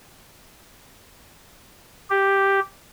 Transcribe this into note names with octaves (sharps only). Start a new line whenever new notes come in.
G4